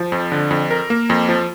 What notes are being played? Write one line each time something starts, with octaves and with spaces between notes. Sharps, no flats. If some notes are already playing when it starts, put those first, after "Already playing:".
Already playing: F3
F2
D3
F2
A#4
A#3
F2
F3